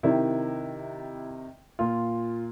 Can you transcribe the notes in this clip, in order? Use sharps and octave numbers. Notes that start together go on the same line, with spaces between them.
C3 D#3 E4
A#2 F4